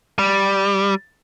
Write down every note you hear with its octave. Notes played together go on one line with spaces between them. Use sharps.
G3